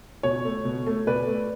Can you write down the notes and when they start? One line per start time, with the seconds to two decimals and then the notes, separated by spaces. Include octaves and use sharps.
0.23 B2 C#5
0.45 A3
0.65 B2
0.87 A3
1.06 B2 B4 D5
1.28 A3